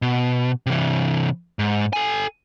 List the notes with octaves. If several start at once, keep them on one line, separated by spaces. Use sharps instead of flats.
B2
C3 E3
G#2
A4 G#5